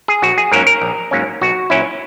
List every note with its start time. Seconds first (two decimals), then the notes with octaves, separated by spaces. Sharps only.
0.08 G#4
0.22 A#1 F#4
0.38 G#4
0.52 G#2 F#3 A#3 C#4 A#4
0.67 A#4
0.82 A#1
1.11 G#2 F#3 A#3 C#4
1.41 B1 F#4
1.70 A#2 F#3 C#4 E4